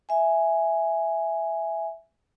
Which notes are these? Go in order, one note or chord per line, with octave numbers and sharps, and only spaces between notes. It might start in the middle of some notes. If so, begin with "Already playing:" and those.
E5 G#5